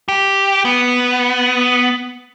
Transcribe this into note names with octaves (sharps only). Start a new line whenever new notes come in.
G4
B3